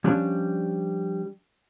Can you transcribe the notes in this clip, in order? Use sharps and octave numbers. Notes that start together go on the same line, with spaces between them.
F3 G3 C#4 D4